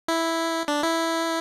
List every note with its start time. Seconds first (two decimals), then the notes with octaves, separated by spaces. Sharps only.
0.08 E4
0.68 D4
0.83 E4